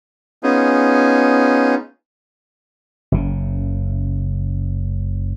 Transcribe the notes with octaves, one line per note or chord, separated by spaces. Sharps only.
B3 C#4 D#4 F4 G#4
F#1 C#3